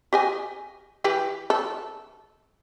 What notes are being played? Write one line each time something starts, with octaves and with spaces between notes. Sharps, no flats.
G4 D#5 G#5
E3 G4 B4
A4